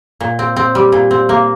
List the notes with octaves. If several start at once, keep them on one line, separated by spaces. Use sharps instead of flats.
A#2
C4
C4
G3
A#2
C4
A#3